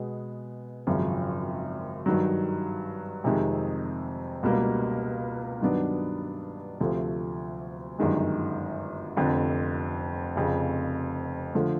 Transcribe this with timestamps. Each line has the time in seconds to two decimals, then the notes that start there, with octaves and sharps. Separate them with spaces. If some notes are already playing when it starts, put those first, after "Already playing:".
Already playing: B2 G#3 B3
0.87 G#1 F#2 C#3 F3
2.06 G2 D#3 F#3
3.24 F2 C3 D#3 G#3
4.43 C#2 B2 G3 A#3
5.61 G2 D#3 F#3 B3 D4
6.80 D2 C3 F3 A3
7.98 G1 F#2 D#3 G#3
9.17 F1 F2 D3
10.36 F1 F2 C#3
11.54 D3 F3 A3